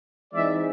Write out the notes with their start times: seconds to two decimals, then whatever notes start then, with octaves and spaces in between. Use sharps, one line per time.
0.33 E3 G#3 C4 D#4 D5 E5